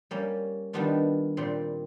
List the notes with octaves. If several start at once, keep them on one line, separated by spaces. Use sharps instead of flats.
G3 A#3 C#4
D#3 G3 B3 D4 F4
A#2 G3 C4